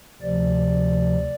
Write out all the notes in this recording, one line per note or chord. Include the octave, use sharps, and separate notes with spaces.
D2 C3 F3 D5